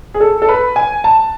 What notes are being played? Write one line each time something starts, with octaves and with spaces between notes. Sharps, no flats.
G#4
A4
A4
B4
G#5
A5